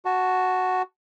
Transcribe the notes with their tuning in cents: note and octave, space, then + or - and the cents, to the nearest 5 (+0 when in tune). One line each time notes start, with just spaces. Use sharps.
F#4 +0 A5 +0